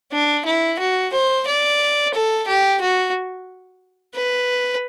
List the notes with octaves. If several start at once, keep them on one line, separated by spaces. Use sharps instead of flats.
D4
E4
F#4
C5
D5
A4
G4
F#4
B4